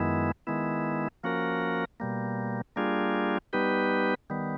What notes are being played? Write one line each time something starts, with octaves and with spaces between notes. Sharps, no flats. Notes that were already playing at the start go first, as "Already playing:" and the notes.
Already playing: F#2 D#3 G#3 B3 E4
D#3 G#3 B3 E4
F3 A#3 C#4 F#4 A#4
B2 G3 A#3
G3 A#3 D4 F4 G#4
G3 B3 D#4 G4 B4
D#3 G3 B3